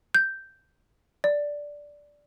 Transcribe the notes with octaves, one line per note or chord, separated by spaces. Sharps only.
G6
D5